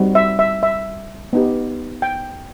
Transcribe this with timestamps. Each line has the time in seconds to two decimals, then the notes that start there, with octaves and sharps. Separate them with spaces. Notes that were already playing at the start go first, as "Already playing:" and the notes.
Already playing: G3 C4 D#4 F#4
0.15 E5
0.39 E5
0.63 E5
1.33 B3 D#4 G4
2.02 G5